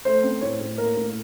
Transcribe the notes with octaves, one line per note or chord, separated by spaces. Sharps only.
A3 C5
C4
A2 C#5
A2
A#3 A#4
A2